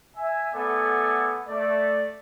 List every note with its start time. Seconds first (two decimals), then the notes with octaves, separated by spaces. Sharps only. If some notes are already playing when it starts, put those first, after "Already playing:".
0.16 E5 G#5
0.53 A3 B3 A4 D5 F#5 G#5
1.48 A3 D5